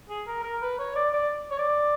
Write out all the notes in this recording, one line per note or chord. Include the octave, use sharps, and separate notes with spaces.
G#4
A#4
A#4
B4
C#5
D5
D5
C#5
D5